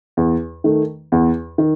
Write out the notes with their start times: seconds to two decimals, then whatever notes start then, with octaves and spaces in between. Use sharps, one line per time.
0.17 E2
0.64 D#3 A3
1.12 E2
1.58 D#3